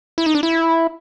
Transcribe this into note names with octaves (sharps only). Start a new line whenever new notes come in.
E4
D#4
D4
E4